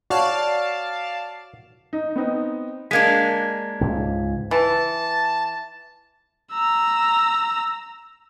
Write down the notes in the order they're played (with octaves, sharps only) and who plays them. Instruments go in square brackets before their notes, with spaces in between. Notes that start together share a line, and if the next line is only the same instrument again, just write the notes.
[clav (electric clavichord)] F#4 C#5 [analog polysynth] D5 F5 A5
[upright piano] D#4
B3 C4 D#4
[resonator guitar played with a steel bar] G#3 A#3 D4 [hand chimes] G#6 B6
[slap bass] C#2 G#2
[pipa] E3 [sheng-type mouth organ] A5
[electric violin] A#5 E6